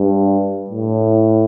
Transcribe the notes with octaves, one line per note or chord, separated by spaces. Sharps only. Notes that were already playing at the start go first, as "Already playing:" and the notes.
Already playing: G2
A2